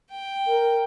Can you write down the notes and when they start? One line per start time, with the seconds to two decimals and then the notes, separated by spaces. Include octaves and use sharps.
0.11 G5
0.46 A#4